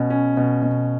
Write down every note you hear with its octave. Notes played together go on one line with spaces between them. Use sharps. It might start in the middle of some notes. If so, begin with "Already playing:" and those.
Already playing: B2 C#4
C#4
B2
B2